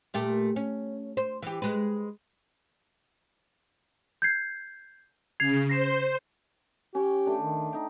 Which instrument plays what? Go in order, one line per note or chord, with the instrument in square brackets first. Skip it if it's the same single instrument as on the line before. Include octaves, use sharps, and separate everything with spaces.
[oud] A#2 A3 G4
C#4
C5
E3 G4
G#3 B4
[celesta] G6 G#6 C7
[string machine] C#3 [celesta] G#6 C7 F7
[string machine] C5 [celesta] A#6 C7 E7
[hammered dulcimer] C#4 C#5 [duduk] G4
[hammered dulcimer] A3 D4 G5
[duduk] D#3
[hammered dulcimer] D#4 G5